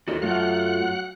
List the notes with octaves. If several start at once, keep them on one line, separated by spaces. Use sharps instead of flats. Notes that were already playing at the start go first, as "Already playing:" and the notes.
D#2 F#4 A4 D#5
F#2 F#3 A3 F4 F#5 F#6